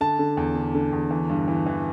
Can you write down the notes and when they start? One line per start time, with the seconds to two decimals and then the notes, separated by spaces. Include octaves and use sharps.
0.01 D3 A5
0.19 D3
0.37 E2
0.55 D3
0.74 D3
0.93 E2
1.11 E3
1.29 G2
1.48 E3
1.66 E3